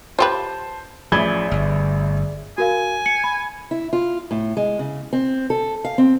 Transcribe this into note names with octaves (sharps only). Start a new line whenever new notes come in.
F4 G4 B4 C5 A5
A1 F3 G#4 D5 E5 B5 G#6
G1
F#4 A#4 F5 G#5
C#7
B5
E4
F4
A2
G#3
C#3
C4
A4
F5
C4